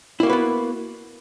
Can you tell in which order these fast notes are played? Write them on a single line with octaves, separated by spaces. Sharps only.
E4 A#3 F#4 B4 B3